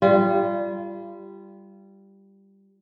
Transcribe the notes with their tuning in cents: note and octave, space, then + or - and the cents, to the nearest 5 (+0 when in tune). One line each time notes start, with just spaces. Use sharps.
G3 +0 F4 -30